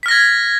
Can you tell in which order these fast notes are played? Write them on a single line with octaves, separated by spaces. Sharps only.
B6 F6 A#6 G#6